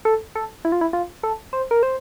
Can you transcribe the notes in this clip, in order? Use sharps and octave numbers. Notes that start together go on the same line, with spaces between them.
A4
A4
E4
F4
E4
F4
A4
C5
A#4
C5